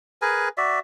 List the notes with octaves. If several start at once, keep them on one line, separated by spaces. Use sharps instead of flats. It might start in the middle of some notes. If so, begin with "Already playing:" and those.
G#4 A#4 B4 G#5
F#4 D5 E5